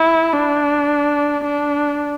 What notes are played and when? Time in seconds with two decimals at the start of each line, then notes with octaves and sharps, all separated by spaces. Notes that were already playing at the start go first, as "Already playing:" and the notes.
Already playing: E4
0.34 D4
1.44 D4